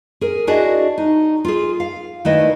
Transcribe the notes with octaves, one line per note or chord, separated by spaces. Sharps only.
G#4 A#4
D4 E4 F#4 G#4 D5 D#5
D#4
F4 G#4
F5
D#3 A3 E4 B4 D5 D#5